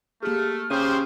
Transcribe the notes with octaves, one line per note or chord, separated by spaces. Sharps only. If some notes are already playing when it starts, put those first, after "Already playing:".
A3 A#3 G4 G#4 F6
C#3 G4 C5 D#7